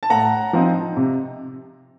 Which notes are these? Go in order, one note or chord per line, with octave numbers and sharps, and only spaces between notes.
A5
A2 F#5 A#5
F3 C4 D#4
C3